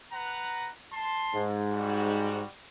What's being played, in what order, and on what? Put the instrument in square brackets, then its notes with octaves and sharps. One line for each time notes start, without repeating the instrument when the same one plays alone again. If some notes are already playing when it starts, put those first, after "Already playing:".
[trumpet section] B4 F#5 A#5
A5 C6
[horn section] G#2
[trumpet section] G3 F#4